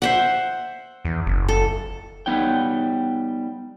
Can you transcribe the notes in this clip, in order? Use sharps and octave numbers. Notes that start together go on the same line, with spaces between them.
C5 E5 F#5
E2
F#1
A4
G3 B3 D#4 C#5 G5